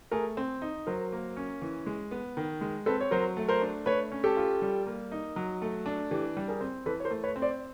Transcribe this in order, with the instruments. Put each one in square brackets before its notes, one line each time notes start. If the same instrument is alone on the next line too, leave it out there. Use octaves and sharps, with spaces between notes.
[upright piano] A3 [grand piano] G#4 A#4
[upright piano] C4
D#4
[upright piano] F#3 [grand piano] A#4 C5
[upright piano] A#3
C#4
E3
G#3
B3
D#3
G#3
[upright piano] C4 [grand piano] A4 B4
[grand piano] C#5
[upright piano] F#3 [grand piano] A#4 C5
[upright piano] A3
[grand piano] A#4 C5
[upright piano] D4
[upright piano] A3 [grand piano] B4 C#5
[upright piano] C#4
[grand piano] G4 A4
[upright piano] F4
G3
A#3
D#4
F#3
A3
D4
[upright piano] E3 [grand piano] G4 A4
[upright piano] G3
[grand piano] G#4 A#4
[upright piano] C4
[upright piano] E3 [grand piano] A4 B4
[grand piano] C#5
A#4 C5
[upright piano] A3
[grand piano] B4 C#5
[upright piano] C4
[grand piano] C5 D5